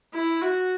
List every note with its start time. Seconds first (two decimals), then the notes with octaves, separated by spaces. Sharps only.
0.14 E4
0.41 F#4